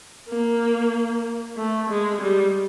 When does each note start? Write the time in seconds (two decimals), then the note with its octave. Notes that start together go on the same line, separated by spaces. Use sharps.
0.29 A#3
1.57 A3
1.89 G#3
2.21 G3